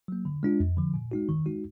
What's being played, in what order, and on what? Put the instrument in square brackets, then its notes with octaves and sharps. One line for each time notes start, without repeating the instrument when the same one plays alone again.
[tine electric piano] F#3 A#3
D3
G#3 D4 F4
F2
D3 F3
A#2
G#3 D#4 F#4
D#3
G#3 D#4 F#4